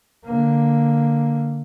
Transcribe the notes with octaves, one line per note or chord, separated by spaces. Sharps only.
D3 A#3